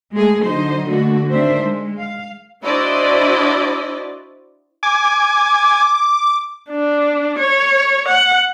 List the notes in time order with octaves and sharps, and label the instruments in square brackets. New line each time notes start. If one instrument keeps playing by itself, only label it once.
[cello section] G#3 A3 G#4
D3 F#3 D#4 C5 D#5
D3 A3 A#3 F#4
D#3 C4 D4 C5 E5
G#3
F5
[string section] D4 E4 F#4 C5 D5 D#5
[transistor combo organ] G#5 [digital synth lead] D6
[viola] D4
C#5
F#5